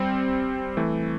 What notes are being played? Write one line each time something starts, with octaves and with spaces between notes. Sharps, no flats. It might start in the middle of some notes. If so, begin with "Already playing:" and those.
Already playing: G3 C4
E3 A3